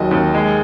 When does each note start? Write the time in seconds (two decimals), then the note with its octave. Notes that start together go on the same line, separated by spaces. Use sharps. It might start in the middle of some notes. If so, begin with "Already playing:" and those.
Already playing: D#2 F#3 D#5
0.11 D#2
0.34 G#3